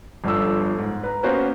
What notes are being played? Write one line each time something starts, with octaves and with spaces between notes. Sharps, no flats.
G1 G2 F3 A4 E6
G#2
B4 A#5
A#3 B3 C#4 F#4 A#4 C5